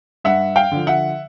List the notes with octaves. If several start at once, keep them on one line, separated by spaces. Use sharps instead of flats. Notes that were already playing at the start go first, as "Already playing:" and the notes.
G2 E5 F#5
F5 G5
D3 F3
E5 F#5